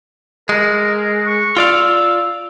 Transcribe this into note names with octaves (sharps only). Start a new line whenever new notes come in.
G#3 A#4
C#6
F4 D5 F5 E6